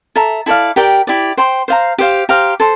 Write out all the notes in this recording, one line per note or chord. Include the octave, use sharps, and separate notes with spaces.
A4 E5 A#5
E4 A4 D5 F5
G4 A#4 D5 G5
E4 G4 D5
C5 G5 C6
C5 F5 A#5
G4 C5 F5
G4 C5 F5 A#5
A4 C5